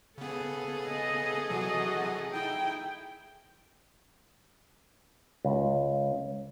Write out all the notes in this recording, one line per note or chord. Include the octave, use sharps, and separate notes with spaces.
C#3 B3 G#4 A4
D#5
C3 E3 F#3 F#4 D#5
D#4 E4 G5
C#2